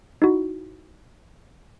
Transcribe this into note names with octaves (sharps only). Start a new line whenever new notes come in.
D#4 E4 F#4